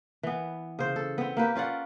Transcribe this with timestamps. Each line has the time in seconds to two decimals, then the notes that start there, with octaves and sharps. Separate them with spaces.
0.23 E3 B3
0.79 C#3 C5
0.96 A4
1.18 B3 C4
1.37 A#3 G4 B4
1.56 C#4 F4 D5 F#5